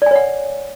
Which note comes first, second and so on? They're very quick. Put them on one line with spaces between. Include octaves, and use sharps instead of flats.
D5 G#5 C#5 F#5